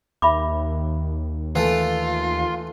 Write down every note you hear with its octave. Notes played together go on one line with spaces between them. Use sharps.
D#2 E5 B5 D6
E3 A3 F4